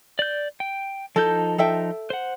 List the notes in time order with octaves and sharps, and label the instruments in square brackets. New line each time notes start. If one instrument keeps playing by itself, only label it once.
[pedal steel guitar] D5 G6
G5
[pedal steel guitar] F3 D#4 G6 [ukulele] A4
[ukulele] A4 E5 G5
[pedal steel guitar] C5 F#5